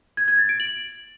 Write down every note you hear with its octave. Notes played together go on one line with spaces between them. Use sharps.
G#6
G#6
A6
D7
F#7